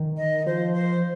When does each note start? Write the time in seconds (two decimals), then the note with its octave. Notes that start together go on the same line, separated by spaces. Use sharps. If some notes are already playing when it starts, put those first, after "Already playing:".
Already playing: D#3
0.17 D#5
0.46 F3 C5
0.73 C5